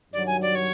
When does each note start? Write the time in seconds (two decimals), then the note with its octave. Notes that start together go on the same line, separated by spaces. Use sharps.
0.12 G2 D#3 F#3 D5
0.26 G#5
0.41 D5
0.55 C#5